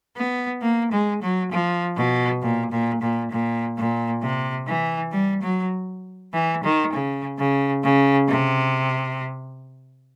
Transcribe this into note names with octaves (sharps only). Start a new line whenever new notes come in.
B3
A#3
G#3
F#3
F3
B2
A#2
A#2
A#2
A#2
A#2
C3
E3
G3
F#3
E3
D#3
C#3
C#3
C#3
C3